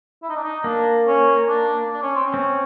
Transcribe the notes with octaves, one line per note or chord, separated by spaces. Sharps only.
E4
D#4
D4
D#4
A#3 D4
C#4
D4
D4
C#4
C4
C#4
C4